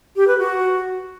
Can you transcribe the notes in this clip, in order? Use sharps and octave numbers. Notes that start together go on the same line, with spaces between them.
G4
B4
F#4